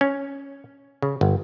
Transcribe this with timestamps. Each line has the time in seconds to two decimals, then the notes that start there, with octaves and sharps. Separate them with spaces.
0.01 C#4
1.02 C#3
1.21 G1